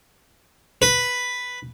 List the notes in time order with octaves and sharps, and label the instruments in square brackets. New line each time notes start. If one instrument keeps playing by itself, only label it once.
[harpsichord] B4